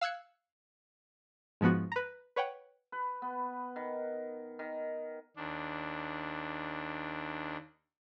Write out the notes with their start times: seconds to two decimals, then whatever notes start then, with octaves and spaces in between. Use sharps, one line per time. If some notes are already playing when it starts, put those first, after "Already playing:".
0.01 F5 E6 F#6 G#6 C#7
1.61 G#2 F3 B3 F#4
1.92 B4 A#5
2.36 B4 C#5 F#5 G5
2.92 B4
3.22 B3
3.76 D#3
4.59 D#3
5.36 D#2 D4